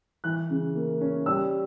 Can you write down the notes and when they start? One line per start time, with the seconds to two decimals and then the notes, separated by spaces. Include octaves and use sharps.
0.24 E3 F#6
0.50 C#3
0.75 A#3
1.01 C#4
1.26 G3 E6